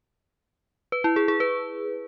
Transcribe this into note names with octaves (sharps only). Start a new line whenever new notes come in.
B4
E4
G#4
G#4
B4